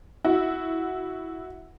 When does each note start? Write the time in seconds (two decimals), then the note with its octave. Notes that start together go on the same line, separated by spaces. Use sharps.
0.25 E4 F#4